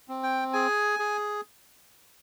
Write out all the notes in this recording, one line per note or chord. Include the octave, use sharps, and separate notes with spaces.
C4
G5
G#4 G#5
G#4